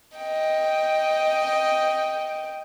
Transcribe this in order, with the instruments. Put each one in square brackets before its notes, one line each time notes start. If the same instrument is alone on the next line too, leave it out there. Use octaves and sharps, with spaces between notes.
[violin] D#5 G5